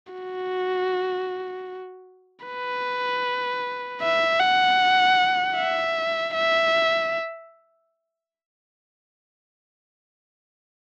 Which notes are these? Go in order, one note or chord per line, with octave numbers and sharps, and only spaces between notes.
F#4
B4
E5
F#5
E5
E5